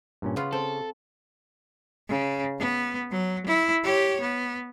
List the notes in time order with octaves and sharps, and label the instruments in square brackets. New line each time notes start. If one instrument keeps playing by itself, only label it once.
[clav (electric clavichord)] G2 A#2 C#4
[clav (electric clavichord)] C#3 [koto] B3 F4
[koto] C4 [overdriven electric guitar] A4
[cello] C#3
B3
F#3
E4
G4 C#5
B3